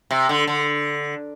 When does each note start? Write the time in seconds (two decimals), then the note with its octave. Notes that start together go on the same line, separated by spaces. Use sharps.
0.11 C3
0.29 D3
0.47 D3